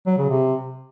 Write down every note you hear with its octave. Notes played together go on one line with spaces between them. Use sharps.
F#3
C#3
C3